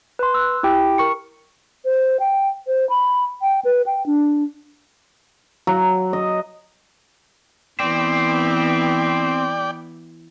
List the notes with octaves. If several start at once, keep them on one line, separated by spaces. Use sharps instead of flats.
B4 C6
E6 F#6
E4 G4 G5
A#4 C#6 C#7
C5
G5
C5
B5
G5
B4
G5
D4
F#3
D#5
E3 B3 C4 D5 G5